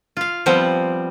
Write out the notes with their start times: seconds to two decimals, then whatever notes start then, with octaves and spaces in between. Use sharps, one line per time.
0.17 F4 F5
0.46 F3 G3 B3 C4